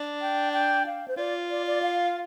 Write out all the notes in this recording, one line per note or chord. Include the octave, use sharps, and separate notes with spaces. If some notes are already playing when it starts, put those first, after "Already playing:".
Already playing: D4
G5
G5
F5
C5
F4 D5
D5
D5
F5